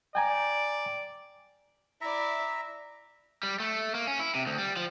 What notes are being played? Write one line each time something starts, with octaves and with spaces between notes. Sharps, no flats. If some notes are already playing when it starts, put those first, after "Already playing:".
D5 G5 G#5 A#5
E4 D5 E5 A#5
G3
A3
A#3
C#4
E4
C3
D2
G3
F3